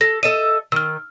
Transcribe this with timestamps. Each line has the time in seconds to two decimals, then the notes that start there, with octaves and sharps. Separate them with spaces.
0.01 A4 A#6
0.23 A4 D#5 E5 D#7
0.72 D#3 E6 F6